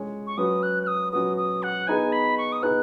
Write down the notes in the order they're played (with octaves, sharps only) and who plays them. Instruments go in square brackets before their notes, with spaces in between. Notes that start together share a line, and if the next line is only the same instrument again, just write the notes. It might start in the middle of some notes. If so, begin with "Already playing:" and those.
Already playing: [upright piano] G#3 C#4 G#4 C#5
[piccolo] C#6
[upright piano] F#3 C#4 F#4 B4 [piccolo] D#6
[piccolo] F#6
F#6
D#6
[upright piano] F#3 C#4 F#4 B4 [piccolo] D#6
[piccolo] D#6
F#5
[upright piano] B3 D#4 G#4 B4 [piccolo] G#5
[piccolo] B5
C#6
D#6
[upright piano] B3 D#4 G#4 B4 [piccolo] F#6